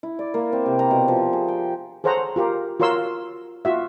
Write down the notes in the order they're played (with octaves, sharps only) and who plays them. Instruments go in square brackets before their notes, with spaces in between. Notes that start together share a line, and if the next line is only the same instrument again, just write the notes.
[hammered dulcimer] E4
D5
A#3
C4
C3
A#5
B2
F3
G#4
G5
[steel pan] G#4 A4 C5 C#5 F#5 A#5
F4 G4 A#4
F4 F#4 A#4 C#5 C6 E6
F4 F#4 E5